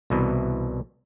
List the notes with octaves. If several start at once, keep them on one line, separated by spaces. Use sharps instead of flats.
C2 B2 E3